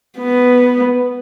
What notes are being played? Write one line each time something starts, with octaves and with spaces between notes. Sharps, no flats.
B3